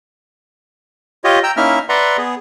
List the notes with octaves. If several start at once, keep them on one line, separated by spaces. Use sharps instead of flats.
F4 G4 C#5 D#5
G5 A#5 E6
A#3 C#4 D#4 E4 E5 F6
B4 D5 E5 F#5 A#5 C6
B3 G#4